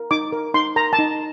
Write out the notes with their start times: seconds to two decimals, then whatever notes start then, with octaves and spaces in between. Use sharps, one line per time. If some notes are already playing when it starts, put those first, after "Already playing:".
Already playing: A#4
0.11 D#4 D6
0.32 A#4
0.54 D#4 C6
0.76 A#4 A#5
0.93 A5
0.99 D#4